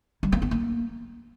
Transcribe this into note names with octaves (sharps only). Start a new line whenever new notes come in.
G3
A#3
B3
A#3